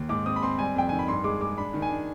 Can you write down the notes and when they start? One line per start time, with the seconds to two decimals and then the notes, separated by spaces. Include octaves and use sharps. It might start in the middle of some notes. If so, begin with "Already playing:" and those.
Already playing: D#2
0.09 G#2 D6
0.26 C4 D#6
0.36 B5
0.43 C4 C6
0.59 G3 G#5
0.76 F2 G5
0.89 D#3 G#5
0.99 B5
1.08 G2 C6
1.24 G#3 D6
1.41 G#3 D6
1.58 D4 B5
1.74 D#3
1.82 G#5
1.90 D4